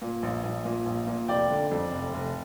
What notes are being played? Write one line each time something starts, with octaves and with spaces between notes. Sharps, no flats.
A#2
A#1
A#1
A#2
A#1
A#2
F1 D5 G5
D3
F2
F1
F1